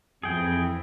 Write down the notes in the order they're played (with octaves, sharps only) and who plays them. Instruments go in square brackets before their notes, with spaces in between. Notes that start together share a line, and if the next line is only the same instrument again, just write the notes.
[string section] F2 E3 [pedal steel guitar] G#4 G5